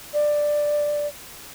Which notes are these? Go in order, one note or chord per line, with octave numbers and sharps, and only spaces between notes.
D5